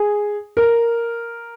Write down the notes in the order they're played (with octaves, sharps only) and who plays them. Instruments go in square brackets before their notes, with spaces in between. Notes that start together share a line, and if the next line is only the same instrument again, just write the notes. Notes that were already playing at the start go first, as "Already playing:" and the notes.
Already playing: [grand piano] G#4
A#4